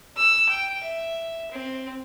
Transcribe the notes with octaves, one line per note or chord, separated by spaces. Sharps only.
E6
G5
E5
C4